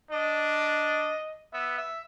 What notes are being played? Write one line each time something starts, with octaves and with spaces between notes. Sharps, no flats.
D4 D#5
B3 E5
E5